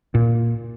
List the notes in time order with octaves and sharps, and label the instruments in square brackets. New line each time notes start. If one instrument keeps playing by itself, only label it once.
[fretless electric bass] A#2